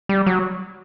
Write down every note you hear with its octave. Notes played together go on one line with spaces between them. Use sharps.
G3
F#3